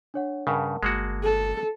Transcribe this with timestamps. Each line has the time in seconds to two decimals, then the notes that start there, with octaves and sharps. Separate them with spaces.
0.14 D4 C#5 F#5
0.47 G2 C#3 A#4 F#5 A5
0.83 G1 G#3 A#3 F#4
1.24 A4